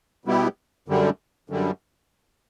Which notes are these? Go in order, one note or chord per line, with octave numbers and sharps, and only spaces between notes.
B2 G3 B3 E4 G4
F#2 D3 G3
F#2 D3 G3